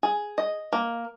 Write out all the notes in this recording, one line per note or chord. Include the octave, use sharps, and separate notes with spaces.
G#4
D#5
A#3